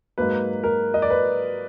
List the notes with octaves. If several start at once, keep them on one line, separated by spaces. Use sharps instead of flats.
G#2 F#3 A#3 B4
A#4
D#5
D5
B4